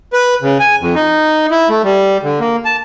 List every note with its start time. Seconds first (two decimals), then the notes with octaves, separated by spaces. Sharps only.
0.13 B4
0.42 C#3
0.60 G#5
0.81 F2
0.95 D#4
1.51 E4
1.69 A3
1.84 G3
2.23 D3
2.40 A#3
2.65 A5